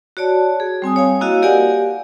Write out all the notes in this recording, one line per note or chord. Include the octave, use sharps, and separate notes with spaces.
F#4 C#5 D5 A5
G#4
G3 C4 G#5 D#6
C#5 F5 G#5
A#3 E4 F#4 D#5 F5
G4 A#4 D5 F5 F#5 G#5